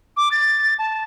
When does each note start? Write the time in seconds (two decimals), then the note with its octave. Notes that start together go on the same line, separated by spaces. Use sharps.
0.17 D6
0.32 A6
0.79 A5